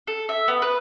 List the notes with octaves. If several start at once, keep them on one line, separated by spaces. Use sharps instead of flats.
A4
E5
B3
B4